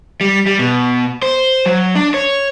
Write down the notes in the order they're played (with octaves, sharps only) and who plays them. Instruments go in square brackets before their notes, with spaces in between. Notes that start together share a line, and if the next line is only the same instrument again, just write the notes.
[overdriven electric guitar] G3
G3
B2
C5
F#3
D4
C#5